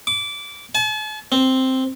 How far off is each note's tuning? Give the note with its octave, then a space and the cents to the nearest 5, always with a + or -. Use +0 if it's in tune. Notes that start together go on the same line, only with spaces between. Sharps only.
D6 -20
A5 -45
C4 +0